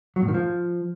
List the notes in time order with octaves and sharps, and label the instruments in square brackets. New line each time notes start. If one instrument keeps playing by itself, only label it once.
[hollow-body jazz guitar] F#3
A2
D#3
F3